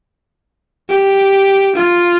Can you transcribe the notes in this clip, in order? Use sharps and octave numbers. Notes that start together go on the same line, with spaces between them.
G4
F4